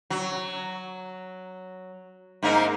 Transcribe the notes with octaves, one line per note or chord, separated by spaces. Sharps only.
F#3
G#2 A#3 D#4